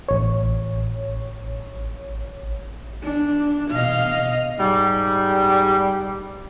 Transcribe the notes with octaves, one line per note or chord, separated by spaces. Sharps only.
A1 C#5
D4
B2 D#5 F5
G#2 G3